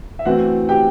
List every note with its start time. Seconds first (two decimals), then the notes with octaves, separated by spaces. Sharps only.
0.19 E5
0.25 E3 A3 C4 F#4 F#5
0.69 G4 G5